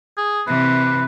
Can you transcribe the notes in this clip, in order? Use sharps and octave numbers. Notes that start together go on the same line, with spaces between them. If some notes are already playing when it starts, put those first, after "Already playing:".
G#4
C3 E3 B4